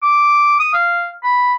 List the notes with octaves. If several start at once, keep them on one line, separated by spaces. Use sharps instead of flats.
D6
D#6
F5
B5